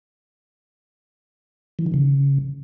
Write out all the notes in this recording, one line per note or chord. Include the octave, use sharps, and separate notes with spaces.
E3
D#3
C#3